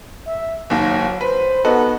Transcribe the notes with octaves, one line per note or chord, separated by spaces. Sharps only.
E5
F#1 D#2 F#3
B4 C5
B3 D#4 F#4 A4